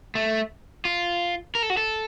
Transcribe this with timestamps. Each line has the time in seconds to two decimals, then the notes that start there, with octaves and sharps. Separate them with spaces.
0.15 A3
0.85 F4
1.55 A#4
1.63 A4
1.70 F#4
1.77 A4